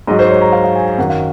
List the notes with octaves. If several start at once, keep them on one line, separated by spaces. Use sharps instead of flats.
G#2 F#3 D#5
C5
C#5
A#5
F5
F5
G#5
G#5
F#2 D#3 F#3 F#5
F5